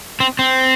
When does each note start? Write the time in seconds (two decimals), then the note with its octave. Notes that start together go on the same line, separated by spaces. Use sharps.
0.20 C4
0.39 C4